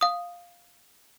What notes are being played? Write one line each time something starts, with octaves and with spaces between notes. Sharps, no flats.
F5 D#6